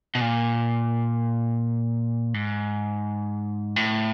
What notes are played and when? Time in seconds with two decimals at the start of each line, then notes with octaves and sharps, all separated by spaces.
0.15 B2
0.21 A#2
2.34 G#2
3.76 A2